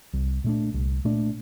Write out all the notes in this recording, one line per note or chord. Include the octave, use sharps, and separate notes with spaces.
C2
A#2 A3 D4
C2
A#2 A3 D4